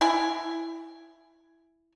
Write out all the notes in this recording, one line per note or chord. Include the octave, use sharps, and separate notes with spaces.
E4 G#5